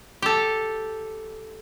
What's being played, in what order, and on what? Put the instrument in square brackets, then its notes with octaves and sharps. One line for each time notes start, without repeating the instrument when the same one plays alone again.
[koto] G4 A4